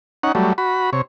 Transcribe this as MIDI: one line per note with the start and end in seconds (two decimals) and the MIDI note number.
0.23 0.32 61
0.23 0.32 63
0.23 0.32 78
0.35 0.53 54
0.35 0.53 55
0.35 0.53 57
0.58 0.90 66
0.58 0.90 83
0.93 1.02 48
0.93 1.02 73